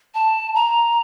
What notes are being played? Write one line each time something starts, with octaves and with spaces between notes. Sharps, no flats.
A5
A#5